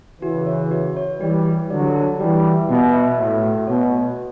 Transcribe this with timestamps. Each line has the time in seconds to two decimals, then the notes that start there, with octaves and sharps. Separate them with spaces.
0.22 C#3 E3 F#4
0.47 C#5
0.71 F#4
0.96 C#5
1.20 E3 G3 G4
1.46 G4
1.70 D3 F#3 D5
1.95 A5
2.20 E3 G3 F#4
2.44 E5
2.69 B2 F#4
2.94 E5
3.18 A2 F#4
3.43 F#4
3.67 B2 C#5
3.93 F#4